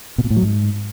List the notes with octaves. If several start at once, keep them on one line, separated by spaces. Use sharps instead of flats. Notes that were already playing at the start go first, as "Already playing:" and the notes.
B2
A#2
A2
F#3
G#2